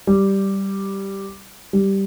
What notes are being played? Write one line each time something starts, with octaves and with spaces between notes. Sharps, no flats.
G3
G3